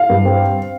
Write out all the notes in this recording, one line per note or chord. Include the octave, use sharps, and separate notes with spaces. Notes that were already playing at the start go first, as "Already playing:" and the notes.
Already playing: F5
G2
C4